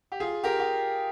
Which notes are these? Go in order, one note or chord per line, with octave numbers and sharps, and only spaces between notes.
G4
F4 G#4
G4 A#4
G4